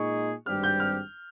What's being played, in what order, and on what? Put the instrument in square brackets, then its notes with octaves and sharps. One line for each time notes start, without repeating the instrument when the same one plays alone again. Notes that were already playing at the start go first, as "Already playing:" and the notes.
Already playing: [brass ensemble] A#2 G#3 D#4 G#4 [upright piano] C#6
[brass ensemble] G#1 G2 G3 C4 G4 [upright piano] F6
[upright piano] G6
F6